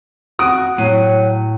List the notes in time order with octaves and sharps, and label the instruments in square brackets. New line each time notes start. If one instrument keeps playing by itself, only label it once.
[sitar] F#4 [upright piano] D#6 D7
[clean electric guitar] A2 [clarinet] F#3 [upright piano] D#7